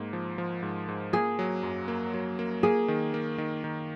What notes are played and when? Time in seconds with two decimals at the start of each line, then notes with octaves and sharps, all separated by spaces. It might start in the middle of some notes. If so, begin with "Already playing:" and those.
Already playing: G#2 A#3
0.13 F3
0.38 F3
0.63 G#2
0.89 G#2
1.13 A#3 G#4
1.39 F#3
1.63 F#2
1.88 A#3
2.14 F#3
2.39 A#3
2.63 A#3 G#4
2.88 D#3
3.14 A#3
3.38 D#3
3.64 D#3